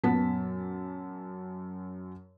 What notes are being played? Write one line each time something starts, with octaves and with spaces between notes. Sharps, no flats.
F#2 A#2 B3 A5 B6